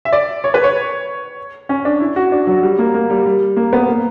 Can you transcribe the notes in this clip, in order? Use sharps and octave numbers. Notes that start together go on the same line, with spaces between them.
E5
D5
C#5
B4
C#5
C#4
D4
E4
F#4
D4
F#3
G3
A#3
A#3
G3
G3
A#3
B3
A#3